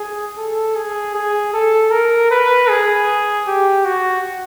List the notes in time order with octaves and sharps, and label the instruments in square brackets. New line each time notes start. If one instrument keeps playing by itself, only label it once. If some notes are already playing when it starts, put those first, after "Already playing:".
Already playing: [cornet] G#4
A4
G#4
G#4
A4
A#4
B4
G#4
G4
F#4